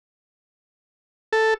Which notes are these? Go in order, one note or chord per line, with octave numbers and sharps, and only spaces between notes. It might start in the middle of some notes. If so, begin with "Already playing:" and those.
A4